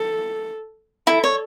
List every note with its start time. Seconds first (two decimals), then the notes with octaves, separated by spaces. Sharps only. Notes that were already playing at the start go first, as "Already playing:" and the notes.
Already playing: A4
1.07 E4 A4
1.24 C#5